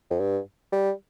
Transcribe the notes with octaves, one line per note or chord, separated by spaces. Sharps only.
F2
G2
G3